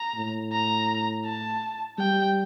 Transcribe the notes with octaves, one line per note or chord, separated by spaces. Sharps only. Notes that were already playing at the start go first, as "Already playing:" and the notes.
Already playing: A#5
A2
A#5
A5
G3 G5